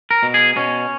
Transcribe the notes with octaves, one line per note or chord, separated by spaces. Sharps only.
A#4
B2
G#4
B2 C#4